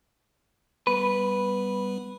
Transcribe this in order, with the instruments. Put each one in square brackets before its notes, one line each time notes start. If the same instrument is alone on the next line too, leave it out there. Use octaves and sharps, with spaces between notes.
[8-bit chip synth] G3 B3 [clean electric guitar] B4